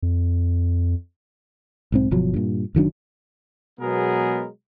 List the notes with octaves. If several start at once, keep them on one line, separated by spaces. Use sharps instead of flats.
F2
B1 G#2 C4
G1 B2 F3 F#3
G2 A#2
F#1 D#3 F#3 D4
B2 F#3 G#3 B3 G#4 A#4